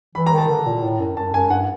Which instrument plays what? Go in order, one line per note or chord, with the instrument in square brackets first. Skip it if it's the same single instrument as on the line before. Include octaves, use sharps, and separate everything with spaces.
[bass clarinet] E3 [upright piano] B5
[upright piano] A#5
[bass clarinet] D#3
[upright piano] A5
[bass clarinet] D3
A#2
A2
F#2
[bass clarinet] F#2 [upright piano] A5
[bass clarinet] F#2 [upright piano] G#5
[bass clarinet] G2 [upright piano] F#5